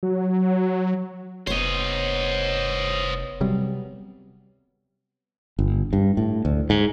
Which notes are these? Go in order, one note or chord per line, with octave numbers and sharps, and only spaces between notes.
F#3
F1 B3 C5 C#5 D#5
C3 F#3 G3
G1
G2
A2
D2
G#2